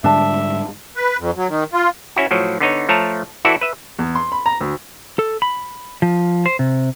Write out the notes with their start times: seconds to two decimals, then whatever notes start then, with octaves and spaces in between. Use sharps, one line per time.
0.04 G#2 D3 G3 D4 E5 A5
0.95 B4
1.19 F2
1.36 F#3
1.49 D#3
1.73 F4
2.16 C#4 E4 F#4
2.31 A2 F3 F#3
2.60 D3 B3 D#4 C#5
2.89 F3 A3 C#5 A5 A#5
3.45 E3 E4 F#4 A4 D5
3.61 B4 E5
3.99 E2
4.15 C6
4.32 B5
4.46 A#5
4.61 D2
5.19 A4
5.42 B5
6.02 F3
6.46 C5
6.59 C3